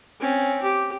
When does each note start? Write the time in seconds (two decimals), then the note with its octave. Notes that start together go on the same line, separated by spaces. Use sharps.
0.20 C4 C#4
0.62 G4